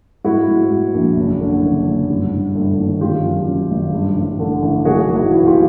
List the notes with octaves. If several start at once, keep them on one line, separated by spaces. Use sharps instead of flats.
G#2 E4 F#4
G#2
G#2
A#1
F#1
D3
F#1
F#1
G2
G1
G1
D#3
G#1 F4 G4
F#2
F#2
G#1
G2
A1
D3
A1
B1 F#4 G#4
B1
E4 F#4
E3
F4 G4